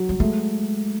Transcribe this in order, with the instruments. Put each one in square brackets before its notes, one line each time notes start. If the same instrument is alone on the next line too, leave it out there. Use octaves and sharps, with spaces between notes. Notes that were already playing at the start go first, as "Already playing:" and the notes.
Already playing: [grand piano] F#3
[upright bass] G3
[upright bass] G#3 [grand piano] A3